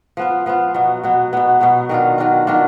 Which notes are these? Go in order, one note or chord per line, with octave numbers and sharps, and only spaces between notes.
F3 B3 F4
F3 B3 F4
B2 F#3 B3
B2 F#3 B3
B2 F#3 B3
B2 F#3 B3
D#3 F#3 D4 F4
D#3 F#3 D4 F4
D#3 F#3 D4 F4